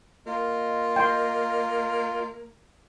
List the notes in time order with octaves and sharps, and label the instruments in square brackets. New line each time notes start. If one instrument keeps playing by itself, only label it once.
[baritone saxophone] A#3 [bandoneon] F4 [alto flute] D#5
[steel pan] G5 C6